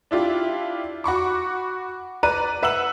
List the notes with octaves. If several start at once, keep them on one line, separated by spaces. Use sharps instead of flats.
D4 E4 F4 G4
F#4 B5 C#6 D6
B4 D5 A#5 F#6 D#7
B4 E5 F#5 E6 E7 F#7